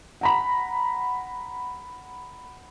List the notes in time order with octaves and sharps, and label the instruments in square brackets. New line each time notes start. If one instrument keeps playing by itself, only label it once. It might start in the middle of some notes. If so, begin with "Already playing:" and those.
[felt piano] F#5 A#5 B5